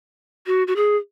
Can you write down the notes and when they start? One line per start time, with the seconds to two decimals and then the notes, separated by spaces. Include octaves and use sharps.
0.46 F#4
0.67 F#4
0.76 G#4